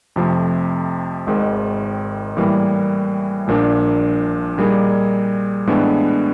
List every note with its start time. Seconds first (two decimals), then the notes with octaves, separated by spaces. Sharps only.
0.16 F2 C3 F3 A3
1.27 G#1 G#2 D#3 G#3
2.37 A2 E3 G3 A#3
3.47 A#1 A#2 F3 A#3 D4
4.58 A#2 G3 A#3 D#4 G#4
5.67 A2 E3 G#3 B3 D4